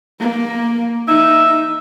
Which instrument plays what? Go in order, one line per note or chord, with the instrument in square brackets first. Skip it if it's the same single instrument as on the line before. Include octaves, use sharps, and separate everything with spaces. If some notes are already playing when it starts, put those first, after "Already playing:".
[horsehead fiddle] A#3
[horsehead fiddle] D#4 [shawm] E5